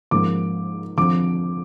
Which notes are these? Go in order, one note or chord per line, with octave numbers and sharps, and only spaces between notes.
G#2 F3 A#3 C#4 D6
F2 D3 F3 D6